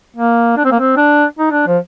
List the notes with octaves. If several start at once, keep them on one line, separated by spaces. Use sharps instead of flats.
A#3
D4
C4
A#3
C4
D4
D#4
D4
F3